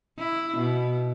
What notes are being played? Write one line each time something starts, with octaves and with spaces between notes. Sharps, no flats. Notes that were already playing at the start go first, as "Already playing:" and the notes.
E4
B2